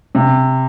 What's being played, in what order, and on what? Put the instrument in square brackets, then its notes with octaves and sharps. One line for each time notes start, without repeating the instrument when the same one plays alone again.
[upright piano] C3